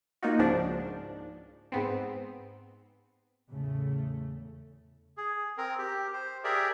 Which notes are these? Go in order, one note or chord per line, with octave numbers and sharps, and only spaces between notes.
A#3 D#4 F4 F#4
C#2 G#2 C#3 F3 D4
G#2 B3 C4
E2 A2 C#3 A3
G#4
C4 A#4
G4
C5
G4 G#4 A#4 D5 E5